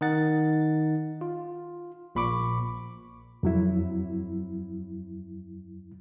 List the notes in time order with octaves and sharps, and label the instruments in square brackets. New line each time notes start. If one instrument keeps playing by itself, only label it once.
[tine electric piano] D#3 D#4 F#5 A6
F4
A#1 A#2 B5 C#6 D6
[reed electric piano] F2 F#3 E4